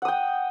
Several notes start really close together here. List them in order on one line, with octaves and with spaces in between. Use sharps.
F#5 D#6 G5